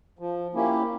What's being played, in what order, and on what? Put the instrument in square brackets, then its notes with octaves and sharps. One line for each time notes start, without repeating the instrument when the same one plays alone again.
[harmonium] F3
A#3 C#4 E4 G4